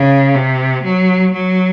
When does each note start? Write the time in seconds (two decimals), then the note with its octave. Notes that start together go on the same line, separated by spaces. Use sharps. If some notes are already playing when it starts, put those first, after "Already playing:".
Already playing: C#3
0.35 C3
0.84 F#3
1.33 F#3